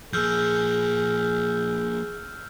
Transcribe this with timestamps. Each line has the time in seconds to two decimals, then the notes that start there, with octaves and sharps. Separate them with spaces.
0.13 F3 A#3 G#4 E6 F6 G6